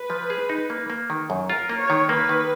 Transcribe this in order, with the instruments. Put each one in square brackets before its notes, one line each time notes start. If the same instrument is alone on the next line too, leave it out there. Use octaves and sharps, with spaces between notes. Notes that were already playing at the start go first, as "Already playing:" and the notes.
Already playing: [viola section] B4
[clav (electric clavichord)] F3
G#4
D#4
A#3
A#3
D#3
F#2
[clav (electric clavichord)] F4 [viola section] A#4
[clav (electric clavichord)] A#3
[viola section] C#5
[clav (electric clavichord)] D#3
[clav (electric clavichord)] A#3 [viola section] B4
[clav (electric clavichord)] D#3